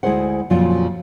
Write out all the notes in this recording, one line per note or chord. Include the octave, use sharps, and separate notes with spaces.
D2 G#3 E4 G#4 C5 F#5
F2 A#2 C#3 F3 F#3 F4